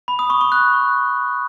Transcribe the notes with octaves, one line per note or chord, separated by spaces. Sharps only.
B5
D#6
C#6
C#6
F#6